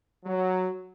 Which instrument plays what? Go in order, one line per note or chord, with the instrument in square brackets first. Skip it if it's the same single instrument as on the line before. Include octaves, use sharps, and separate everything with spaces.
[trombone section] F#3